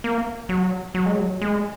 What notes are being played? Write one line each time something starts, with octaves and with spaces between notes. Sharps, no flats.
A#3
F#3
F#3
G#3
F#3
G#3